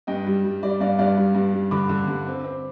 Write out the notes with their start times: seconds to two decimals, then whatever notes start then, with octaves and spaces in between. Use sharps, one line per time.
0.07 G2 D#5 G5
0.26 G3
0.44 G3
0.63 G3 D5
0.81 G2 D5 F5
0.98 G2 D5 F5
1.17 G3
1.35 G2
1.53 G3
1.71 D3 B5 D6
1.89 D3
2.07 G2
2.27 C4
2.44 C4